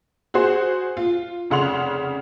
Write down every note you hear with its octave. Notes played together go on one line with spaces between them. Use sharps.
F#4 G#4 C5 C6
F4
F1 C#3 F#5 C6 F7